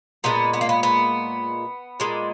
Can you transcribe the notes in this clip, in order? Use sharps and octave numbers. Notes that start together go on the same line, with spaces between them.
A#2 G#3 B3
B3
A#3
B3
B3
A#2 G#3